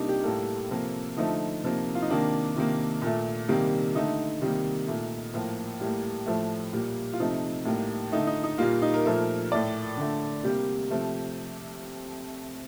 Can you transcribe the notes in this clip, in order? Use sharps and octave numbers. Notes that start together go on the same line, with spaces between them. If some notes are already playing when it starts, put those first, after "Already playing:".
Already playing: C3 G3 A#3 D4 D#4
G4
A2 G3 A#3 A4
C3 F3 A#3
D3 F3 A3 D#4
C3 F3 A#3
F4
D#4
C3 D#3 A#3 D4
C3 D#3 A#3
A#2 A3
C3 D#3 G3 A#3
D3 A3 D#4
C3 D#3 G3 A#3
A#2 A3
A2 F3 A#3
A2 G3 A#3
A2 F3 A3
A#2 G3 A#3
F4
C3 F3 A3 D#4
A2 G3 A#3
D3 A3 D#4
D#4
D#4
A#2 G3 A#3 F4
D#4
A#4
A#2 F3 A3
A2 A3 D5
D3 A3
C3 G3 A#3 G4
C3 F3 A3